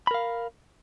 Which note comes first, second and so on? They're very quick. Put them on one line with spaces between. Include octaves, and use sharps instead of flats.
B5 A#4 F5